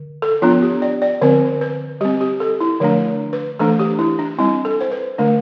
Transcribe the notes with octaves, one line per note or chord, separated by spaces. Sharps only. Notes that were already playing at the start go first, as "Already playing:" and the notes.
Already playing: D3
A4
F3 B3 D4 F4
G4
D5
D5
D3 F3 C4 C5
B4
G3 C4 G4
G4
A4
E4
D3 F3 A3 D4
B4
E3 A3 D4 A4
G4
E4
D4
G3 C4 E4
A4
C5
B4
D3 A3 D4